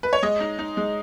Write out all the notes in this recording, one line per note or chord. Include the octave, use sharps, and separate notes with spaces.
B4
C#5
G#3 D#5
D#4
D#4
G#3